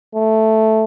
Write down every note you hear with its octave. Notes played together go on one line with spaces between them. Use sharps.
A3